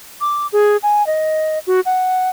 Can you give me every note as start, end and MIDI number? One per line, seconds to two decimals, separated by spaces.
0.21 0.47 86
0.53 0.77 68
0.83 1.06 80
1.07 1.59 75
1.67 1.80 66
1.86 2.30 78